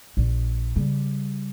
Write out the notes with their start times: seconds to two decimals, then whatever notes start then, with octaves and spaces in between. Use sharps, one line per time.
0.17 A#1
0.76 C#3 G3